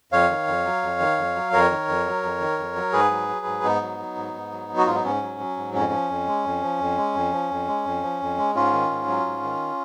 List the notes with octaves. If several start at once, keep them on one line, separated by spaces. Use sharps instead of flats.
F2 C#5 F5
D#3
F2
F#3
F2
D#3
F2
F#3
F2 A#4 C#5
D#3
F2
F#3
F2
D#3
F2
F#3
G#2 G#4 B4
F#3
F#3
G#2
G#2 B3 D#4
F#3
F#3
G#2
G#2
F#3
F#3
F#4
G#2 F4
D#4
G#2 C#4
F#3
F#3
G#2
F2 C#4
F3
F2
G#3
F2
F3
F2
G#3
F2
F3
F2
G#3
F2
F3
F2
G#3
G#2 C#4 F4
D#3
G#2
F#3
G#2
D#3